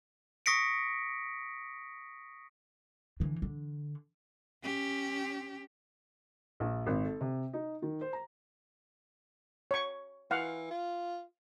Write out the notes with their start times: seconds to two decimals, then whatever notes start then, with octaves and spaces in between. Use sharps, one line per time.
0.46 C#6 D#6 A#6 B6 C#7 D7
3.20 D3 E3
3.42 D3
4.63 C#4 G4
6.60 A#1
6.86 G#1
7.04 A4
7.21 C3
7.53 D#4
7.82 D#3
8.01 C5
8.13 A#5
9.71 C#5 C#6
10.31 E3 F5 F#5
10.71 F4